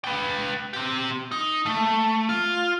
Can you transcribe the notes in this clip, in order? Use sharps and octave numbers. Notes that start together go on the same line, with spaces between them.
B4 G5
C4 G4
D#4
A3
F4